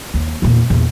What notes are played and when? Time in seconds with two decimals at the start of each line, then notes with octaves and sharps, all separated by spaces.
0.14 D#2
0.42 E2 A#2
0.70 E2 A#2